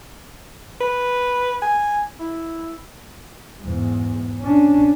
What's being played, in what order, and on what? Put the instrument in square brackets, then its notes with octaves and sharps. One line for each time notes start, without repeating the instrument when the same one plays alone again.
[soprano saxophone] B4
G#5
E4
[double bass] E2 G#2
C#4 D4